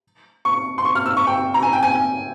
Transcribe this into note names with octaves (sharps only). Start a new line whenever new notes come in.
C#6
C6
C#6
F6
E6
C#6
G5
A#5
G#5
G5
G#5